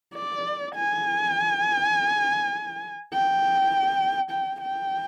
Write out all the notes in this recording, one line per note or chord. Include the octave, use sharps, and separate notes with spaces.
D5
G#5
G5
G5
G5